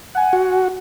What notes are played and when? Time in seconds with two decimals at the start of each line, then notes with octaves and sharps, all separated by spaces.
0.15 F#5 G#5
0.33 F#4